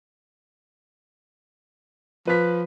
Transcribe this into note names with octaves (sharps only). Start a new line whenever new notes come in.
F3 B4 B6